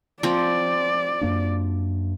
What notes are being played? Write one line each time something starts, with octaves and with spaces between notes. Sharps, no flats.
F3 C4 D5
F#2 A#3 D4